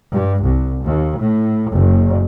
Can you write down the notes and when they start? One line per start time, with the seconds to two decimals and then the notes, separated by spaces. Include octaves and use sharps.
0.13 G2
0.42 C2
0.83 D#2
1.18 A2
1.69 F#1